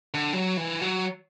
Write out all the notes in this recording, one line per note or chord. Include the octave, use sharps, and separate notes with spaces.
D3
F#3
E3
F#3